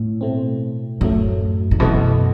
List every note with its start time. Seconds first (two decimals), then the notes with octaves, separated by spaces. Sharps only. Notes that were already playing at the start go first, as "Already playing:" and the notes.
Already playing: A2
0.21 B2 A3 C4
1.01 F#2 A2 F#3 A3
1.71 A2
1.79 F#2 B2 E3 A3